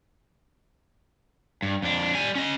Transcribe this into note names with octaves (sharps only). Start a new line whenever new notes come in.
G2
F2 D4
G3 G#5
C#4 D#5